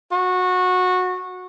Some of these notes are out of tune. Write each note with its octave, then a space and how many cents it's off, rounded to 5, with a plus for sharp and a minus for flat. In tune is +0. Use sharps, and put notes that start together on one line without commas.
F#4 -20